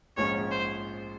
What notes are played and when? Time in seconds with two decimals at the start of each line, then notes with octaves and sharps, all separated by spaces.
0.17 A#1 G#2 F3 G#3 C#4 C#5
0.51 C5